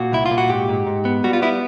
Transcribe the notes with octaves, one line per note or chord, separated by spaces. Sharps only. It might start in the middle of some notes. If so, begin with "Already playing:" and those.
Already playing: A#2 F#4
C2 E4
F4
A#2
F#4
G#2 G4
G#2
G#2
B3
G3 F#4
F4
B3 E4